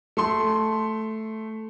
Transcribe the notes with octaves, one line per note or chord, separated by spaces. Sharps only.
A3 C6